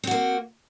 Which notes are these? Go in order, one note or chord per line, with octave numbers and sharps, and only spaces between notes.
A#3 C4 F#4